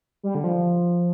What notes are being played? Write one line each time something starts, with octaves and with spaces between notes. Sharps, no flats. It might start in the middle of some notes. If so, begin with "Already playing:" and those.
G3
D3
F3